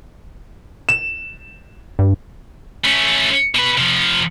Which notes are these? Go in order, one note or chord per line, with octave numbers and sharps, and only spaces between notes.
E7
G2
A3 C#4
B2 B4
C3 F3